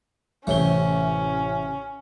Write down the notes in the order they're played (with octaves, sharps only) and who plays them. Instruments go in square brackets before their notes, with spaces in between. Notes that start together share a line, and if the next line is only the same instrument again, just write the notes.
[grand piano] A1 C#5 G7 [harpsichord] C3 A3 [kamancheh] C#4